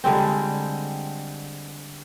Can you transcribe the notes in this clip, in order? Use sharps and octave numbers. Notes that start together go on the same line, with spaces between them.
D3 G3 G#3 C4